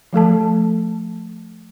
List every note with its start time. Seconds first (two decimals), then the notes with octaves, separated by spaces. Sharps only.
0.13 F3 A3 A4 A5